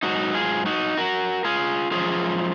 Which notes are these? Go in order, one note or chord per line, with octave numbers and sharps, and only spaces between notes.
G#2 F#3 D#4 F#4
F4 G#4
D#4 F#4
F#4 A#4
F4 G#4
F#2 F3 G#3 F4 G#4